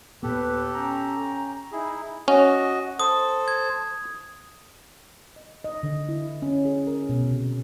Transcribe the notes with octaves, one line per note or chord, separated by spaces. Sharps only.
D#2 A#2 B3 G4 A4 B4
C#4 G5 A#5
D#4 E4 G#4
C#4 F#4 D#5
A4 C5 D#6
G#6
D#5
D#5
D3
E4
C#4
G#4
A#4
B2
C3